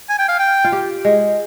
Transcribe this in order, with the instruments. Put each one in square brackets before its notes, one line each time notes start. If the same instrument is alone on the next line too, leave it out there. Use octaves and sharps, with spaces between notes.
[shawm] G#5
G5
F5
G5
[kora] F4
G4
G#3